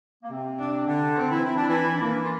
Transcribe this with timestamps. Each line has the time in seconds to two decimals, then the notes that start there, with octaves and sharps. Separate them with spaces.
0.23 A#3
0.30 C3 C4
0.59 D4
0.86 D3 D4
1.15 C4
1.30 E3 E4
1.44 E4
1.55 D4
1.67 E3 E4
1.95 D4
2.00 E3 A#3 E4
2.24 F4